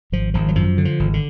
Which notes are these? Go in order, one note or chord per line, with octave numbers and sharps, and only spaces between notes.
G#1 F3
G#1 F3
F#3
F#2 F3
D3
F3
G#1
D3